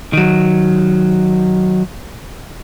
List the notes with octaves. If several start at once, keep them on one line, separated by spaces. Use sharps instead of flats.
D#3 F#3